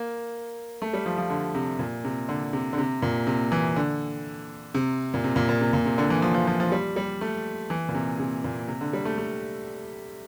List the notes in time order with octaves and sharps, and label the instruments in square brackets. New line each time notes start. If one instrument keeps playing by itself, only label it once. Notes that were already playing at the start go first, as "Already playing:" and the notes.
Already playing: [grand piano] A#3
A3
G3
F3
F3
D3
C3
A#2
C3
D3
C3
D3
C3
A#2
C3
E3
D3
C3
A#2
C3
A#2
A#2
C3
A#2
C3
D3
E3
F3
F3
F3
F3
G3
G3
A3
E3
A#2
C3
C3
A#2
C3
D3
G3
A3
A3